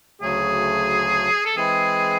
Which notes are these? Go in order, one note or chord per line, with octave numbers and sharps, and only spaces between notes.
D2 C#3 F#3 A3 G#4
A4
E3 G#3 C4 E4 G#4